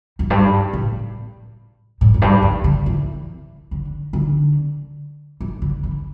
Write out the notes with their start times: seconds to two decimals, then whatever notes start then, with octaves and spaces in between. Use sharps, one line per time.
0.19 F2
0.30 G2
0.73 A2
2.01 A2
2.14 F2
2.22 G2
2.42 F2
2.64 D3
2.86 E3
3.71 D3
4.13 D3
5.41 E3
5.62 D3
5.83 E3